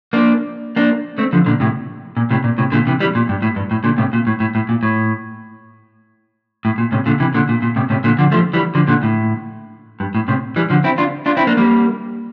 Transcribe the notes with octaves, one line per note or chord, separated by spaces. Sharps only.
A#3 D4
A#3 D4
A3 C4
D3 F3
A#2 D3
A2 C3
A#2
A2 C3
A#2
A2 C3
A#2 D3
C3 E3
E3 G3
A#2
G2
A2
G2
A2
A#2 D3
A2 C3
A#2
A2
A2
A2
A#2
A2
A2
A#2
A2 C3
A#2 D3
C3 E3
A#2 D3
A#2
A#2
A2 C3
A2 C3
A#2 D3
D3 F3
F3 A3
E3 G3
D3 F3
A#2 D3
A2
G2
A2
A2 C3
E3 G3
D3 F3
C4 E4
D4 F4
D4 F4
C4 E4
A#3 D4
G3 A#3